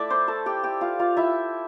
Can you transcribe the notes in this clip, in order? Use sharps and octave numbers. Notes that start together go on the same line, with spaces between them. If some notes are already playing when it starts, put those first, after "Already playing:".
Already playing: A3 E4 D5 E5 D6
C5 C6
A4 A5
G4 G5
G4 G5
F4 F5
F4 F5
E4 E5